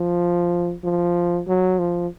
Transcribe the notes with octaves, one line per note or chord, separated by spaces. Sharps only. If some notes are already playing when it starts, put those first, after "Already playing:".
Already playing: F3
F3
F#3
F3